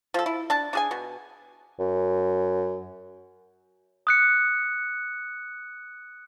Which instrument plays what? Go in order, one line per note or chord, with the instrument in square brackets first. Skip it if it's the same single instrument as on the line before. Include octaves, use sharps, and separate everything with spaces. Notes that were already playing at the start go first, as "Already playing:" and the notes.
[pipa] F3 A4
E4
D4 A5
D4 G#4 G#5
B2
[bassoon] F#2
[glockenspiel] D#6 F#6 C#7